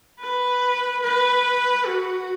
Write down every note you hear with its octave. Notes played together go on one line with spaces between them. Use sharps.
B4
B4
F#4